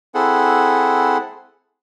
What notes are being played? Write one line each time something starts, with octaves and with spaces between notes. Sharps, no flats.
C4 E4 G#4 A4 F#5